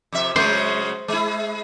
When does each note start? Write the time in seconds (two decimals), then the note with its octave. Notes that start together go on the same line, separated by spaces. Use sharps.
0.12 F2 C3 E5
0.36 C#3 F#3 G#3 C5
1.08 G#3 E4